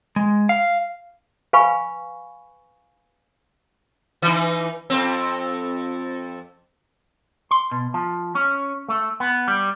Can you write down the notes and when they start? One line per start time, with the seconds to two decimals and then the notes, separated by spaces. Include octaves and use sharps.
0.16 G#3
0.49 F5
1.53 B4 F5 G#5 B5 C#6
4.22 E3 D#4
4.90 F2 C4
7.51 C6
7.71 B2
7.94 F3
8.35 C#4
8.88 A3
9.20 B3
9.48 G3